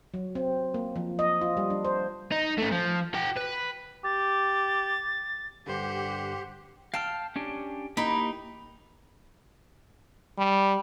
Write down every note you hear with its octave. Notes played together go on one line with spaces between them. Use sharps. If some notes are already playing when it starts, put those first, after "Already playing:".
F#3
C4
A#3
F3
D#5
F4
G3
D4
C5
D#4
A3 C#4
F3
F#4 G5
B4
G4 A6
G2 D3 G4 C5 F#5
F5 G5 A5 F6
C#4 D4 G4
A#3 D#4 E4 G4 B5
G3